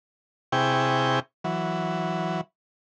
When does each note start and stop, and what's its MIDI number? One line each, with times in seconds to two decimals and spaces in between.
0.52 1.20 48
0.52 1.20 64
0.52 1.20 68
0.52 1.20 79
0.52 1.20 85
1.44 2.41 52
1.44 2.41 54